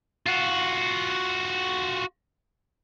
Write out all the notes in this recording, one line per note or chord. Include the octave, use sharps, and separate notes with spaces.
F4 F#4